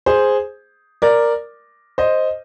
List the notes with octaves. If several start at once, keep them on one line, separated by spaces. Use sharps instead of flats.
G#4 C5
A#4 D5
C5 D#5